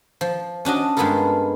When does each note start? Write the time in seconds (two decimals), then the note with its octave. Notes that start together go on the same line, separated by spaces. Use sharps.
0.21 F3
0.65 C#4 D4 F#4 D#5
0.97 G2 G#3 B3 F4 A4 A#4